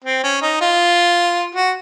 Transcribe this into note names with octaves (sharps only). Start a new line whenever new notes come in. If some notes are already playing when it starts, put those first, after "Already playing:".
C4
C#4
D#4
F4
F#4